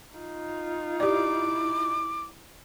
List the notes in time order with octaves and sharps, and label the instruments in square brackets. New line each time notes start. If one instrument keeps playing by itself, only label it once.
[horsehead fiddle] D#4 F4
[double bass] E4 [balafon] G4 D5 [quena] D6